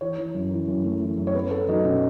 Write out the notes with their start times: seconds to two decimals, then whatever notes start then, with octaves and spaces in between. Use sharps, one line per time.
0.01 E3 C#5
0.18 E3
0.35 F#2
0.51 E3
0.68 F#2
0.84 A3
1.02 E3
1.17 F#2
1.27 C#5
1.34 B3 B4
1.51 B3 A4
1.68 F#3 D#4
1.84 B2 C#4